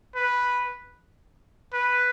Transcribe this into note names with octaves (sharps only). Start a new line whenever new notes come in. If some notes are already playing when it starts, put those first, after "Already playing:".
B4
B4